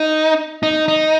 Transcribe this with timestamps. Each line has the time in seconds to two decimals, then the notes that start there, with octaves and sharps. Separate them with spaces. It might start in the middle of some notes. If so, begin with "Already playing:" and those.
Already playing: D#4
0.63 D#4
0.88 D#4